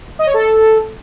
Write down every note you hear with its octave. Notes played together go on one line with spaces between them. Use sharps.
D#5
C#5
A4